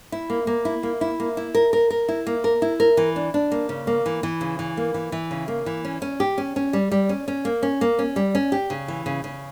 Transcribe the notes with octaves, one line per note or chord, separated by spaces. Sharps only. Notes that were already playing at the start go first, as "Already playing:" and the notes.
E4
A#3
A#3
E4
A#3
E4
A#3
E4
A#4
A#4
A#4
E4
A#3
A#4
E4
A#4
E3
D4
D4
A#3
C#3
A#3
E3
E3
C#3
E3
A#3
E3
E3
C#3
A#3
E3
C#4
C#4
G4
C#4
C#4
G3
G3
C#4
C#4
A#3
C#4
A#3
C#4
G3
C#4
G4
C#3
E3
C#3
C#3